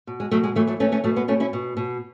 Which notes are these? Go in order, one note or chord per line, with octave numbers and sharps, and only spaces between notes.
B2
G#3
B2 F#3 A3
G#3
E3 F#3 A3
F#3 A3
E3 A3 C#4
A3 C#4
B2 F#3 A3
G#3 B3
B2 A3 C#4
C#4 E4
B2
B2